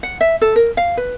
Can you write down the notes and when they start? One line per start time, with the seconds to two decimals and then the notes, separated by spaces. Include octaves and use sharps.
0.03 F#5
0.21 E5
0.41 A4
0.56 A#4
0.77 F5
0.97 B4